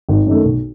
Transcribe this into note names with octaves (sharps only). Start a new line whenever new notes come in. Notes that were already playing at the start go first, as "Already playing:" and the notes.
G#1
F#2 D#3 A3
B1